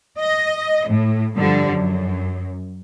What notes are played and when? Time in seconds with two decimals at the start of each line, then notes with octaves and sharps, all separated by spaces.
0.19 D#5
0.89 A2
1.35 G2 D3 F3 G3
1.72 F#2